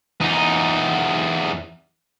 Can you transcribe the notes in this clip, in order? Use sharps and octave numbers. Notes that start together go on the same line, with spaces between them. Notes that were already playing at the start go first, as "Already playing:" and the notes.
E2 D#4